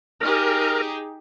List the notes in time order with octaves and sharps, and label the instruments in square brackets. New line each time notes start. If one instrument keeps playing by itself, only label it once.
[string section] D#4 G4 G#4 [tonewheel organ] A#4